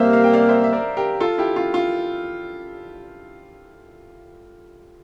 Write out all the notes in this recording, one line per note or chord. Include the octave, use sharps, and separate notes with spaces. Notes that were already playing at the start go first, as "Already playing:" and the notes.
Already playing: C3 G3 A#3 C5 E5 F5
F5
G5
D5 F5
C5 E5
E5
A#4 D5
G4 A#4
F4 A4
E4 G4
F4
F4